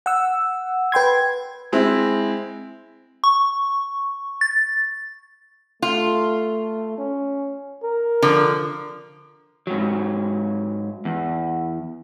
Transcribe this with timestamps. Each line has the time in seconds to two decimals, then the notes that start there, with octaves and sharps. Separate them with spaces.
0.06 F#5 E6
0.92 B4 G5 C6 G#6
1.72 G#3 C4 E4
3.24 C#6
4.41 A6
5.82 A3 F4
6.98 C#4
7.84 A#4
8.22 D3 F3
9.67 G#2 F#3
11.05 E2